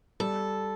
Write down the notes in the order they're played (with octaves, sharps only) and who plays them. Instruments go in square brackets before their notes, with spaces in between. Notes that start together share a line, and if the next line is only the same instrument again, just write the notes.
[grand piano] G3 [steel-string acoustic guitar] A4